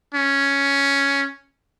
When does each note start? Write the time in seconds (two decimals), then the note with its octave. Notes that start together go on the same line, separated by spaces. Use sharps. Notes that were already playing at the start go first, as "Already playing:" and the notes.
0.14 C#4